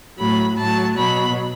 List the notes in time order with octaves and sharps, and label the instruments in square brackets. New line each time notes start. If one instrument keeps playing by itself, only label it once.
[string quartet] A2 F#3 B5
A2 F#3 A5
B2 F#3 B5